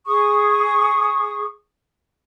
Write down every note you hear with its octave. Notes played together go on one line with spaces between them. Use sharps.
G#4 C#6 D#6